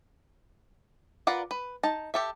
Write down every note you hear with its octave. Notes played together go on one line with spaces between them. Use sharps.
F4 A#4 B4 D5 F#5
B4
D#4 A5
G4 A4 E5